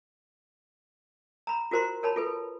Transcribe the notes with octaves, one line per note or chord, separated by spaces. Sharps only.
A#5 B5
F4 F#4 A#4 C5 A#5 C6
A#4 C#5 A5 B5
F4 A4 B4